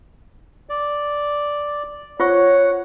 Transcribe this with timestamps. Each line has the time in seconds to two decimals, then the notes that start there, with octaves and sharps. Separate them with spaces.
0.69 D5
2.20 F4 C5 C#5 F#5 C#6